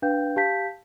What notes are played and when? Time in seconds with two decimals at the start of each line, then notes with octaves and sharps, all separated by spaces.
0.02 D4 B4 F5 G5 G6
0.36 G4 F5 A5 G6 B6